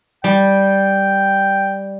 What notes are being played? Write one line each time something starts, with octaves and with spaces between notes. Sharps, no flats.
G3 G5